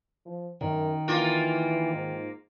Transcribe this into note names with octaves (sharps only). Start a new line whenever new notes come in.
F3
F#2 D#3
E3 A#3 F4
G#2